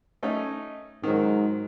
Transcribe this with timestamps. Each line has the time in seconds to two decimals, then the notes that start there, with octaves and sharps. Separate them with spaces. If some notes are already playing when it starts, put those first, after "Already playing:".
0.23 A3 C#4 D#4
1.03 G#2 D#3 F#3